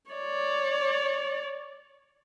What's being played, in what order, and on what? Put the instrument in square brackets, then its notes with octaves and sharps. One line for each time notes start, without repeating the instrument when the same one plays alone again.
[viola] C#5 D5